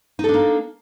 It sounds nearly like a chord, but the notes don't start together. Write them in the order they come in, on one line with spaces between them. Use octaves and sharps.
D#4 A4 D4 A#3